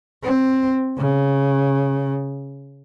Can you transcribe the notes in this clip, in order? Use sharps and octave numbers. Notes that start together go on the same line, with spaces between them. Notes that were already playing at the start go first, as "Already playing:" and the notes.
C4
C#3